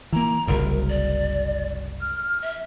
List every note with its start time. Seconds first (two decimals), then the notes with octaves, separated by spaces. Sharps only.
0.13 E3 A#3 A#5
0.47 F#1 C2 F#2 A#4
0.89 D5
2.01 F6
2.42 E5